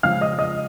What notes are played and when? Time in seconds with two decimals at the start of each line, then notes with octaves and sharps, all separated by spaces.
0.03 C#3 F3 G#3 F5 F6
0.21 D#5 D#6
0.39 D#5 D#6